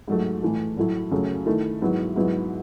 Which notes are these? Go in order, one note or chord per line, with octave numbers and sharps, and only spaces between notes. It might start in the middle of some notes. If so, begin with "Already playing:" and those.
G#2 F#3 A3
A2 E3 A3
A2 F#3 A3 E4
F#2 C#3 F#3 A3
D#3 A3 E4
G#2 F#3 B3 E4
G#2 F#3 B3 E4